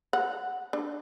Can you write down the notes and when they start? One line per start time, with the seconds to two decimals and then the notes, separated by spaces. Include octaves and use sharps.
0.13 F#5
0.73 D4